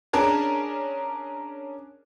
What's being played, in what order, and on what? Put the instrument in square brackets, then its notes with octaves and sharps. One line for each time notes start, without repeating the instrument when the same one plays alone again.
[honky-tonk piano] C#4 D4 G#4 A#4 A5